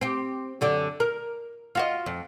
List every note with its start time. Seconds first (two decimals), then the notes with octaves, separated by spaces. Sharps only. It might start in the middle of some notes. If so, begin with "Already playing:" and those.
0.01 C4 G4
0.61 F#2 D3 G4
1.00 A#4
1.75 F4 F#4 D#5
2.06 F2